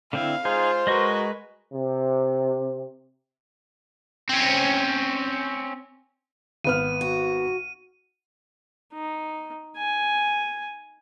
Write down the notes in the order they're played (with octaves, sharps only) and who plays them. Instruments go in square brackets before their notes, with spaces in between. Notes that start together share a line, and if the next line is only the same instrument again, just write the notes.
[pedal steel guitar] D3 C4 E4 [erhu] F5
[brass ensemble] G#3 F4 [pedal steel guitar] D#4 G#4 [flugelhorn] C5
[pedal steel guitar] G#3 D#5 C#6 [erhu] F#4 [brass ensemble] A#4 B4
[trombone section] C3
[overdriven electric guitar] C4 C#4
[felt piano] G#1 B3 F6 [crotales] D#7
[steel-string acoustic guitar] F#4
[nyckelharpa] D#4
G#5